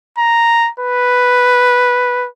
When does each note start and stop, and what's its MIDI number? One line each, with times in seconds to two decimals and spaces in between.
0.18 0.70 82
0.80 2.27 71